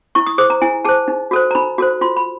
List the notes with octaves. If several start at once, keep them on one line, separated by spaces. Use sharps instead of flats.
E4 C#6
D#6
G#4 C5 D#6
A#5
E4 G#5
G#4 C5 A5
D#4
F#4 A4 C5
A#5
D#4 B5
F#4 A4 C5
F4 C6
B5